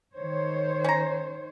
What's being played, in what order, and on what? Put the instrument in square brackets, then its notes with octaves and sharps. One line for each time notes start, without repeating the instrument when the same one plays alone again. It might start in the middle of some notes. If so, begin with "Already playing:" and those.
[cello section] D#3 C5 C#5
[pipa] C#4 A#5